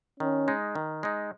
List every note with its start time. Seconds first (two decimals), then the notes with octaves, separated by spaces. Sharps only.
0.20 D#3 C#4
0.48 G#3 D#4
0.75 D#3
1.03 G#3 D#4